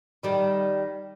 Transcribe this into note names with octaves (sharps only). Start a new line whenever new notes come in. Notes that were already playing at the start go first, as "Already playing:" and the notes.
D#3 G3